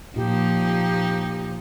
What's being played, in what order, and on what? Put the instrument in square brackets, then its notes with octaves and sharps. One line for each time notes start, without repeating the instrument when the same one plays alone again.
[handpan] A#2 [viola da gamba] F3 D#4 [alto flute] G4